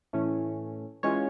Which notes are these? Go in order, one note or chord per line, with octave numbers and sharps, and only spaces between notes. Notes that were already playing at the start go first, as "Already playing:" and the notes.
A2 E3 A3 C#4
E3 G#3 C#4 F4 C#5